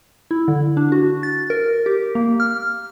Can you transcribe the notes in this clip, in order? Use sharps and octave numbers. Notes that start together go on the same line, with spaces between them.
E4
D3
D4
F#4
A6
A#4
G4
A#3
F6